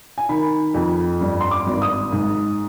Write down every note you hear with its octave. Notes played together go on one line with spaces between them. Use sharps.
G#5
D#3 B5
F2
G2
C6
D6
G#1
D#6
G#2